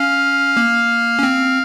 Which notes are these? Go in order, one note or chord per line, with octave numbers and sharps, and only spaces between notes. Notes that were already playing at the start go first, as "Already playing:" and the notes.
Already playing: C#4 F5
A#3
C#4
C4